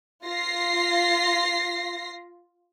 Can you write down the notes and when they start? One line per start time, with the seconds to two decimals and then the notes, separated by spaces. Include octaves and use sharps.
0.24 F4 A#6 C7